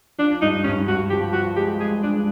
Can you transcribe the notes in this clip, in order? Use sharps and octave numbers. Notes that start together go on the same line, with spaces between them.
F3 D4
G2 D#4
G2 C#4
G2 F#4
F3 G4
F3 F#4
G#3 G4
G#3 G#4
G#3 D4